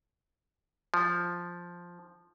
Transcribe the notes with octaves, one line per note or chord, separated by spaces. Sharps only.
F3